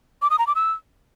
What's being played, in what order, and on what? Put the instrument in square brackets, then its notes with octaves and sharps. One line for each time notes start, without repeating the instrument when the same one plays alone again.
[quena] D6
D#6
A#5
D6
E6